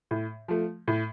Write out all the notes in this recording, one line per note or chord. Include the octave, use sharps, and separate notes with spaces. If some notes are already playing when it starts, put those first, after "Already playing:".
A2
F3 A3
A2